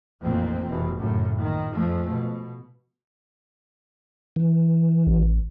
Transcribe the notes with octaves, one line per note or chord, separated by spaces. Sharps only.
A1 F2 A#2 D#3 A#3 C4
F1 E2 B2
F#2 A2 C#3
A#1 D#3
F2 F3 G#3 A3
B2
E3
A1